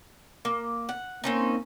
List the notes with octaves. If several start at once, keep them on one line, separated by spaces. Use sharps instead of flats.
A#3
F#5
A#3 C4 C#4 D#4